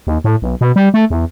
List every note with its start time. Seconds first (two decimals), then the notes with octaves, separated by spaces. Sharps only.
0.07 D#2
0.24 A2
0.42 B1
0.61 B2
0.76 G3
0.94 A3
1.10 E2